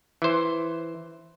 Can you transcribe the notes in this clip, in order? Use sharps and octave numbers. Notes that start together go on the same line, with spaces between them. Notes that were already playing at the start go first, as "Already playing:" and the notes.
E3 C5